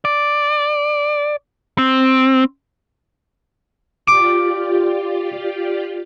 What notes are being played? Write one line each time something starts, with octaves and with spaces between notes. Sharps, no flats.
D5
C4
F4 G4 D5 D6